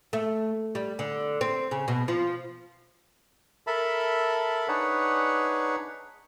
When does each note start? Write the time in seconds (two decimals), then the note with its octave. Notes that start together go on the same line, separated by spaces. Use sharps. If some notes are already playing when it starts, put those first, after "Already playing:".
0.13 A3
0.75 G3
0.99 D3
1.41 C4
1.71 C#3
1.88 B2
2.08 F3
3.67 A4 A#4 E5 A5 B5
4.68 D4 D#4 G#4 B4 C#5 F#5